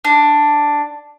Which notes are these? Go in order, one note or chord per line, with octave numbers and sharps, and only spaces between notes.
D4